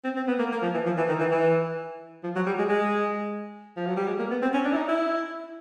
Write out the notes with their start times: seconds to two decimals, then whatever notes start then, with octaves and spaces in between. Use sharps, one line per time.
0.04 C4
0.16 C4
0.28 B3
0.39 A#3
0.52 A#3
0.62 F3
0.74 E3
0.86 F3
0.98 E3
1.09 D#3
1.20 E3
1.31 E3
2.24 F3
2.36 F#3
2.46 G3
2.58 G#3
2.69 G#3
3.77 F3
3.87 F#3
3.97 G3
4.07 G#3
4.19 A#3
4.31 B3
4.42 C4
4.54 C#4
4.65 D4
4.73 E4
4.77 D#4
4.89 E4